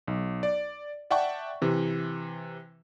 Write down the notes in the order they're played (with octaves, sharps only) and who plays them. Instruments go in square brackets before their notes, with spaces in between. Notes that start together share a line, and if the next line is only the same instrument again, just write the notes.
[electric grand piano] B1
D5
D5 E5 F#5 G5 A5 C#6
C3 E3